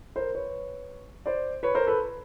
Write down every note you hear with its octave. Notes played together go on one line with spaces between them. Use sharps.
A#4 C5
B4 C#5
C5 D5
B4 C#5
A#4 C5
A4 B4